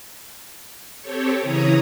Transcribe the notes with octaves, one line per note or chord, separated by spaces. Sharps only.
C4 G4 A4 C#5
C#3 E3 E4 C#5 A#5 D#6